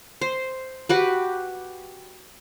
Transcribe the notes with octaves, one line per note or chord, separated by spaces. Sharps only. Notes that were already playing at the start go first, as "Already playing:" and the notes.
C5
F#4 G4 B4